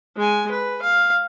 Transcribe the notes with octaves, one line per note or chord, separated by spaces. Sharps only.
G#3 G#5
B4
F5